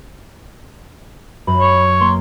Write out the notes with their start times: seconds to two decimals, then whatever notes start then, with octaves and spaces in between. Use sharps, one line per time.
1.47 F#2 B5
1.61 C#5
2.00 A#3 C6